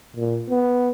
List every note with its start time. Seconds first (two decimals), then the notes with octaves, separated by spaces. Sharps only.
0.17 A#2
0.50 B3